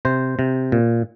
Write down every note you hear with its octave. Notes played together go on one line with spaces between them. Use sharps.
C3 C5
C3
A#2